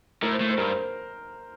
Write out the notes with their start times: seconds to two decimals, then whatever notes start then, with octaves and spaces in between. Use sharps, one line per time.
0.22 A2 A#4
0.31 C5
0.40 A2
0.49 C5
0.58 G2 A#4
0.68 C5